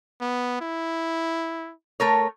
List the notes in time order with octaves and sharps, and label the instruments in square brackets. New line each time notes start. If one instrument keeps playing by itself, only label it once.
[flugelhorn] B3
E4
[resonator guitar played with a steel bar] A3 A#4 C#5